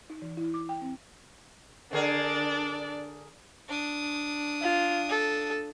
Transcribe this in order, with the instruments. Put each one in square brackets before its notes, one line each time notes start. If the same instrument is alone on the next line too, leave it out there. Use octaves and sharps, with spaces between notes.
[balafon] D#4
E3
E4
D6
G5
C4
[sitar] D3 G#4 A#4 [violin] D4 D5
[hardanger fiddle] D4 D#6
[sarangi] F4
A4